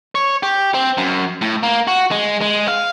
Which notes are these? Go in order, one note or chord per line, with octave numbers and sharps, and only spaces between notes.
C#5
G4
C4
F#2
A2
A#3
F#4
G#3
G#3
F5